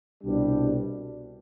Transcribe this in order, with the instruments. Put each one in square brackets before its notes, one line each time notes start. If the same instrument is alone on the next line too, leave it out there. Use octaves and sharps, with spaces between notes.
[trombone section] C2 B2 G3 D4